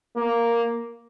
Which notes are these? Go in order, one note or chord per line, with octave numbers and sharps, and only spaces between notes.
A#3